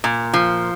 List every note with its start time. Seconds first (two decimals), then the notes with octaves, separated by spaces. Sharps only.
0.04 A#2
0.34 F3